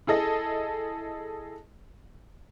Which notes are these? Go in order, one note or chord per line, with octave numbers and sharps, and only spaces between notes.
E4 G#4 A4 D#5